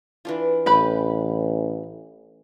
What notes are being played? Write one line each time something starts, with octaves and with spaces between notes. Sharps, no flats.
E3 D4 F4
A1 G4 B4 B5